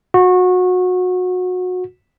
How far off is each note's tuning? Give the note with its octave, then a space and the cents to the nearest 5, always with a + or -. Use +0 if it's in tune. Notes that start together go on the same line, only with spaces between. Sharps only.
F#4 -25